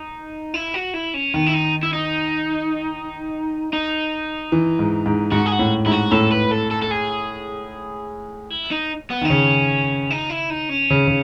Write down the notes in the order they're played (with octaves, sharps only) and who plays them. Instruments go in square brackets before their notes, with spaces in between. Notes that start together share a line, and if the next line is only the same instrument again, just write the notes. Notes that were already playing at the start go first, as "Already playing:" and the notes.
Already playing: [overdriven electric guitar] D#4
E4
F#4
E4
C#4
[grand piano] D#3 [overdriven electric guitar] B3
[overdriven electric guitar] E4
D#4
E4
D#4
D#4
[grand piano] E3
G#2
G#2
[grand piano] G#2 [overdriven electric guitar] F#4
[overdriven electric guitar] G#4
F#4
[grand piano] A2
[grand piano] G#2 [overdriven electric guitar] E4
[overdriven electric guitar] F#4
[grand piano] A2 [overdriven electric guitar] A4
[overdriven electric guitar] B4
A4
A4
A4
G#4
E4
D#4
B3
[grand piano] D#3
[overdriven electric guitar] D#4
[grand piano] C#3 [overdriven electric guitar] C#4
[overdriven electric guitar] D#4
E4
D#4
C#4
[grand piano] C#3
C#3